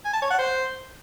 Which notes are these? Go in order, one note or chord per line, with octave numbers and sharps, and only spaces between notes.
G#5
A5
C#5
F#5
C5